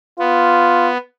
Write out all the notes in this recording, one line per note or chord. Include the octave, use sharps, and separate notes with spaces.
B3 F4